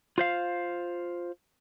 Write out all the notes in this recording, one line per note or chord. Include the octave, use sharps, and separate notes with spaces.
F4 C5 F5